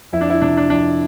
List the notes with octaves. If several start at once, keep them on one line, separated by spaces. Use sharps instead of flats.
F2 E4
D4
E4
C3 D4
D4
F2 D4